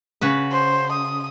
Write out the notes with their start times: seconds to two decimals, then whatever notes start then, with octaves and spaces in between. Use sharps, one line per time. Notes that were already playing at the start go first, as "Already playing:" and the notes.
0.21 C#3 F#4 B4
0.52 C5
0.93 D#6